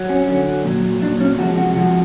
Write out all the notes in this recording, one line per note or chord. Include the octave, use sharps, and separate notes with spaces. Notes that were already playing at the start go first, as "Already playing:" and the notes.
Already playing: F#3
C#4
D3 F#3
A#2 F#3
A#2 F#3 D4
C#4
C3 F3 G#3 F#4
F#4
C3 F3 G#3 F#4